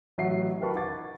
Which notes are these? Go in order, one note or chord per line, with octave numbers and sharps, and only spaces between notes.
A1 F#3 E5 F#5 C7
G4 A#4 B4 A5 C#6
D#4 F#5 D6 A6